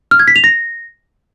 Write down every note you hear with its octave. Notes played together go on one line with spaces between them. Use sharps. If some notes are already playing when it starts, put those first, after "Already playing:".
F6
G#6
B6
F7
A#6